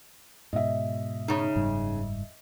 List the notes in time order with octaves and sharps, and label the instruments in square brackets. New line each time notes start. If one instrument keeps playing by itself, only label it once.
[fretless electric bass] G#2 B2 [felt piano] D#5 E5
[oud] C#3 D#4
[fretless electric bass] F#1 G#2 G3